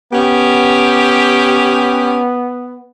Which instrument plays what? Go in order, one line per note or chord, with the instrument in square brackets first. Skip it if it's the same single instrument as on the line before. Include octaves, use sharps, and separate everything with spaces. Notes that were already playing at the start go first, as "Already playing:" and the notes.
[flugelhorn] B3 [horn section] C#4 G4